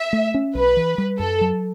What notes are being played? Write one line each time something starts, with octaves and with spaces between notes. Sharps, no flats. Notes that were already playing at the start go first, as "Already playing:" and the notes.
Already playing: E5
A3
C#4
B1 B4
E3
G3
F#2 A4
F#3